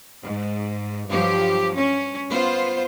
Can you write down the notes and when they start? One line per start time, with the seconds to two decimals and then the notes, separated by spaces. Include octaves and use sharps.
0.23 G#2
1.07 G2 F3 F#3 G4
1.74 C#4
2.30 B3 F4 C5